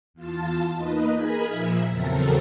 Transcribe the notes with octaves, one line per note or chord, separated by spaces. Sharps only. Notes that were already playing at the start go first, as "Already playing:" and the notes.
E2 F4 A5
A#3 D#4 B4 D#5
G#4 A#4 G#5 B5
A#2 F3 E5
E2 C#3 F#3 C4 A4 A#4